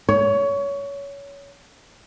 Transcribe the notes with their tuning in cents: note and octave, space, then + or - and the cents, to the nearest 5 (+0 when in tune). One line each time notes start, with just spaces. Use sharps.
C#5 +20